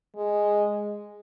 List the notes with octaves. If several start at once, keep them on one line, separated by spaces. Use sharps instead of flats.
G#3